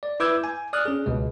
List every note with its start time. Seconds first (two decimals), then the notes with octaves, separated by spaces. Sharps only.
0.03 D5
0.20 E4 B4 D6 E6 G6 G#6
0.44 G#5
0.73 D5 D#6 F6 F#6
0.85 C#4 G#4
1.06 C#2 B2 G#3